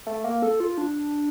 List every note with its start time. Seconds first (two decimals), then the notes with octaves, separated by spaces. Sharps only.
0.07 A3
0.24 A#3
0.42 A4
0.60 F4
0.78 D4